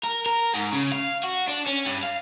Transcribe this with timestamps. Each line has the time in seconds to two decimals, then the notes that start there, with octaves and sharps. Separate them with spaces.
0.04 A#4
0.26 A#4
0.54 G#2
0.73 C#3
0.92 F5
1.24 F#4
1.48 D4
1.67 C#4
1.86 G2
2.03 F5